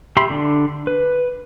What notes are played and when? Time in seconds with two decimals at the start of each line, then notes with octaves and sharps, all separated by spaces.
0.17 G4 E5 B5 C6
0.30 D3 D4
0.87 B4